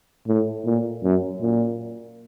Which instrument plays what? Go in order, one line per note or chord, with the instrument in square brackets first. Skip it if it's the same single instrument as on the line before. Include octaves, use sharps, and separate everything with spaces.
[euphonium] A2
A#2
F#2
A#2